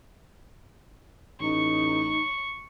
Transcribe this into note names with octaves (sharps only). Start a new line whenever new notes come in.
A1 D#4 C#6